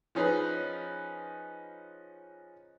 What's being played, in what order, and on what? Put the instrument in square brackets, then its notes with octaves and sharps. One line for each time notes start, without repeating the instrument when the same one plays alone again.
[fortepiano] F3 C#4 D#4 G#4 B4